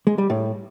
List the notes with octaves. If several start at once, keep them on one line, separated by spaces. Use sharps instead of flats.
G#3
G3
A2